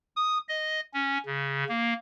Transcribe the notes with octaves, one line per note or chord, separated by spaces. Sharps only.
D#6
D#5
C#4
C#3
A#3